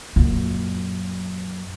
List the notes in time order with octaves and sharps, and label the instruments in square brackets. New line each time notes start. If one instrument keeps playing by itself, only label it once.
[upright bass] F#2 A#2